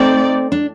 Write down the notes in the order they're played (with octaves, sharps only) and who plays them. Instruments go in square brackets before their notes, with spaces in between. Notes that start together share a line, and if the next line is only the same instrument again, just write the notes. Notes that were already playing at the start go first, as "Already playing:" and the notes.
Already playing: [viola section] A3 D#4 A4 D5 [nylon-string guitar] C4
[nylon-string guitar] D4